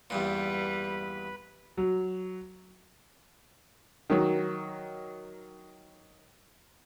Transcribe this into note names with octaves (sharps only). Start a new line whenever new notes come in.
E2 G2 A#2 G3 B4 B5
F#3
D#3 F#3